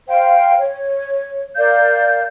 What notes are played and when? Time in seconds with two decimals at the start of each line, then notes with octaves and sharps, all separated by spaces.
0.08 C5 F5 G5
0.58 C#5
1.56 A#4 D5 F5 G6